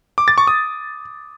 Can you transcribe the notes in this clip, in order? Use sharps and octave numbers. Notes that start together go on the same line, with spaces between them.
D6
A6
C#6
D#6